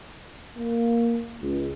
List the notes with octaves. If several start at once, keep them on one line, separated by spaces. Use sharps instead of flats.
A#3
C#2